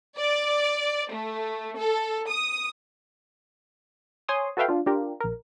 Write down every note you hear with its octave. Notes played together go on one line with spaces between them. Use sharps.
D5
A3
A4
D#6
C5 C#5 G#5 C6 D#6
F#4 A4 B4 E5 F5 G5
D4 F4
D4 F4 G4 A#4
A#1 A#4